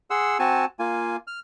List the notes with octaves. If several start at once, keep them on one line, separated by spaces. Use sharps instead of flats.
G#4 F#5 C6 E6
C4 F#4 G#5 A5
A#3 F4 G#5
F6